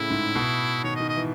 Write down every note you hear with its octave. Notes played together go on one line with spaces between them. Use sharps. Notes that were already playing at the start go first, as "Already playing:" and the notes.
Already playing: A2 C#3 E4
G#2
B2
D#3 C#5
D#5
D#3
D#5
E3